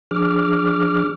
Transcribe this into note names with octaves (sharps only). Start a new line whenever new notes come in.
F3 D4 G#4 D6 F6